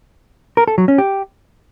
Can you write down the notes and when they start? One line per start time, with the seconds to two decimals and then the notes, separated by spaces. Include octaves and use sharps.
0.57 A#4
0.68 A4
0.78 F#3
0.88 C#4
0.98 G4